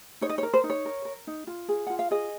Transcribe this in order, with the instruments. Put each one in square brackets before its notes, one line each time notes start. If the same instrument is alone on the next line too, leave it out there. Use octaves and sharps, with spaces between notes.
[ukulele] D#4 C#5
D#5
C#5
A#4
C5
D#4
C#5
A#4
A#4
D#4
F4
G#4
F4 F#5
F5
G#4 D#5